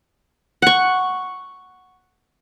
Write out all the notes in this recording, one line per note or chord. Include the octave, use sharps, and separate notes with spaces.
F#5 C#6